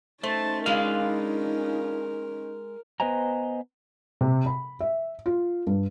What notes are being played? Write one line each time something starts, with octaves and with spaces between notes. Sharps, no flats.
A3 C#4 D#4 C5 A5
G#3 D4 F4 A#4 B4 F5
B3 B4 C5 D#5 G#5 A#5
C3
B5
E5
F4
G2